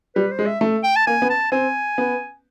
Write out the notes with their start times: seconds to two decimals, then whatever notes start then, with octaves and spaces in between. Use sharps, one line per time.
0.15 G3 B4
0.31 C5
0.39 G#3
0.46 E5
0.61 A3
0.83 G5
0.96 A5
1.07 A#3 G#5
1.22 B3
1.30 A5
1.52 C4 G#5
1.98 B3